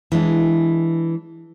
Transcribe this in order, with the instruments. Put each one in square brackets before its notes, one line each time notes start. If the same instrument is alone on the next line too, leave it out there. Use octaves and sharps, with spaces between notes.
[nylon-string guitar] E3 G#3 D4